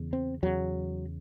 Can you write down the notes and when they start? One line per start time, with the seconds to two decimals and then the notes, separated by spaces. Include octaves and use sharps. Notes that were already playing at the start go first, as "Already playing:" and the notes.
Already playing: E2 C#3
0.13 C4
0.43 E2 C#3 F#3